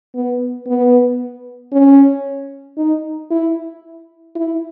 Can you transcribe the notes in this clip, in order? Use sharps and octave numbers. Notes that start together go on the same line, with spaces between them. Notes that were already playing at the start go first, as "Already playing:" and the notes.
B3
B3
C#4
D#4
E4
E4